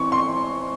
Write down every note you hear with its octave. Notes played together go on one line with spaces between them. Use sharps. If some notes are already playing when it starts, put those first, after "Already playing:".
Already playing: E3 C4 C#6
C6